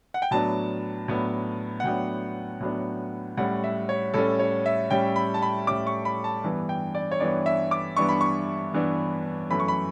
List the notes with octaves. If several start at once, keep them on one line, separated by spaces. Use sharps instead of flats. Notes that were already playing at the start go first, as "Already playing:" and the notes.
F#5
G5
A2 F#3 B3 D4 A5
A2 F#3 B3 D4
F#5
A2 F#3 B3 D4 G5
A2 F#3 B3 D4
A2 G3 C#4 F#5
E5
C#5
A2 G3 C#4 A4
C#5
E5
A2 G3 C#4 G5
B5
A5
B5
A2 G3 C#4 D6
C#6
B5
A5
G2 E3 B3 D4
G5
D5
C#5
G2 E3 B3 D4 D5
E5
D6
G2 E3 B3 D4 C#6
B5
C#6
G2 E3 B3 D4
F#2 E3 A3 C#4 B5
C#6
B5